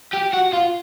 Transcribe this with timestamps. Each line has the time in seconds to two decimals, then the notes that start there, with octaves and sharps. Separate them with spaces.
0.14 G4
0.34 F#4
0.54 F4